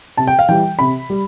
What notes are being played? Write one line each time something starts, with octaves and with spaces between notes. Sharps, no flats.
C3 A5
G5
F5
E3 G3 G5
C3 B5
G3